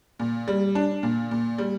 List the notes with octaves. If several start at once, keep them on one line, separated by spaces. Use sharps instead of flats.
A#2
G3
D4
A#2
A#2
G3